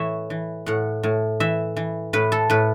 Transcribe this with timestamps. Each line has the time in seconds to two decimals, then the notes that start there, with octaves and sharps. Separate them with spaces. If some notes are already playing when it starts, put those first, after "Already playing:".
Already playing: A2 E3 C#5 E5
0.30 E3
0.66 A2 F#5
1.03 A2
1.40 E3 E5
1.76 E3
2.13 A2 B4
2.32 A4
2.50 A2 B4